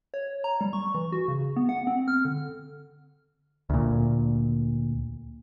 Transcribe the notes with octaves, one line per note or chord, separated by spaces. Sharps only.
C#5
A#5
G3
C#6
E3
F#4
C#3
B3
F#5
C4
F6
D3
D2 A#2